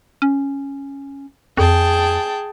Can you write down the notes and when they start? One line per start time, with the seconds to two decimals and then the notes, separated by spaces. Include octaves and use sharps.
0.22 C#4
1.57 F2 G#4 G5 A5